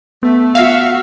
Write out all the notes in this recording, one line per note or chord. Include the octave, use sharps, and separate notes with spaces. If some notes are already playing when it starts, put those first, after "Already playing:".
A3 B3
F#4 E5 F5